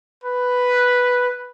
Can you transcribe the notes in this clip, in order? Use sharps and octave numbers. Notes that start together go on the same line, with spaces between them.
B4